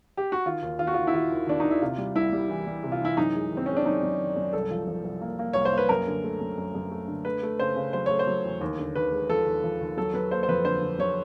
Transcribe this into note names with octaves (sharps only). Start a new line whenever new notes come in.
G4
F#4
D#3 F4
D#2
D#3 F4
F#4
D#2 F4
E4
D#3 F4
D#2
D#2 D4
D#4
D#3
E4
C3 F4
G3
C2 E4
G3
E3
G3
C3
F4
E3 E4
F#2 D#4
G#3
D#3
C4
G#3 C#4
D4
F#2 D#4
F#2
D#3
F#2
C2 A4
F3
F3
C2
A#3
A#3
C2 C#5
C5
A#3 B4
F#2 A#4
D3
A3
F#2
F#2
F#2
A3
D3
A3 B4
A3
C#3 C5
C#3
F#3 C5
A3 C#5
C5
F#3
E2
D#2
D3
D#2 B4
G#3
F3 A4
D#2
F3
D#2
F#3 A4
F#3 B4
A#3 C5
C5
F2 B4
D3 C5
D3
F#3 C#5